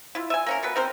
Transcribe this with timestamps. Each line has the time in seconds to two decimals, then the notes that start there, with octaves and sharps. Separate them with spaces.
0.15 E4 F4
0.30 E5 G#5
0.46 A#3 C#4 A#4
0.63 B2 B3 B4
0.76 C4 A#4 C5